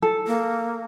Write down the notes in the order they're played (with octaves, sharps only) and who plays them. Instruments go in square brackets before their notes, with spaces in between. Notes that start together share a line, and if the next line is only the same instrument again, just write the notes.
[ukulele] A4
[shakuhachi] A#3